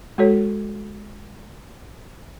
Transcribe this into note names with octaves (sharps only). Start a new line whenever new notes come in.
G#3 F#4 A4 C#5